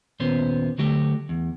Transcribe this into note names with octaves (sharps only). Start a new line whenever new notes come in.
D#2 A#2 B3 C#4 C5
D3 F#3 A3 F#4 G4
E2